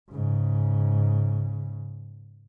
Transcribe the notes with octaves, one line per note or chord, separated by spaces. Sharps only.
G#2 C#3